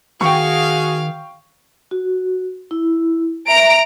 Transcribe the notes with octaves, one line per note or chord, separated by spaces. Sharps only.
D#3 F#4 G#4 F5 G5 C#6
F#4
E4
E5 A#5 D7